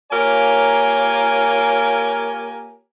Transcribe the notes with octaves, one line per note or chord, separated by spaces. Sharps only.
A#3 F4 G4 A#4 C#5 G#5